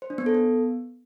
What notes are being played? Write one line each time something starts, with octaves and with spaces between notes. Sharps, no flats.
C5
D4
B3
A4
B3